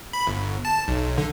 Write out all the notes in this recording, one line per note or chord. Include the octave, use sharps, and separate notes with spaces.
B5
G1
A5
B1
D3